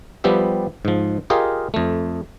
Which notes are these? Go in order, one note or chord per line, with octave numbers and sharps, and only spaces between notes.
F3 G3 B3 G4 E5
G#2 F3
F4 G4 G#4 A#4 D#5 F5
F2 A3